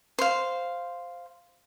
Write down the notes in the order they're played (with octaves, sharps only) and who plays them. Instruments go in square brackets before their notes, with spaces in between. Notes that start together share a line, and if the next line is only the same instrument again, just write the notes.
[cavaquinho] C5 F5